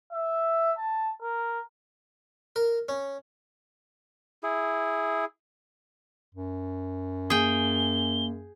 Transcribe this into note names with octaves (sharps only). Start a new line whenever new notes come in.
E5
A5
A#4
A#4
C#4
E4 G#4
F#2
A#3 G#4 G5 G7